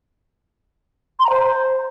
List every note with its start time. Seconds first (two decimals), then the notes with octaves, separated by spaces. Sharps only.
1.19 C6
1.24 A#5
1.30 C5